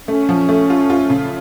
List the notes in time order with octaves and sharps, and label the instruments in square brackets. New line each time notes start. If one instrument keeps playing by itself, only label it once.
[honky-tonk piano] A3 [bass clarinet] C#4
[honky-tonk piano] F3
A3
F4
F4
C#3